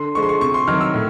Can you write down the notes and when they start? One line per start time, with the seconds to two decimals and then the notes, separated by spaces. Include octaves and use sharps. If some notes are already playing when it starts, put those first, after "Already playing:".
Already playing: D3 C6
0.15 F3 G#3 C#6
0.23 C6
0.29 C#6
0.41 C3 C#6
0.54 C6
0.68 D#3 F#3 F6
0.81 E6
0.94 A2